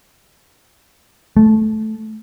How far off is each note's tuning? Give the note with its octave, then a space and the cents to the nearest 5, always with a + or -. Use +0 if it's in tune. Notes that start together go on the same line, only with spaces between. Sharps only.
A3 -15